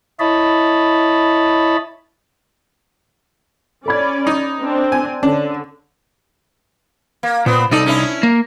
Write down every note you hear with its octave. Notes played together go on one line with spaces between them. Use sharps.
E4 C#5 D#5 A5 B5
C#4 A4 D5 B5 G#6
D#4
C4 D4
G#5
D3 C#4 D4
A#3
A#2 B3 C4
C2 D#4 A4 D5
C#4 D4 E4
A#3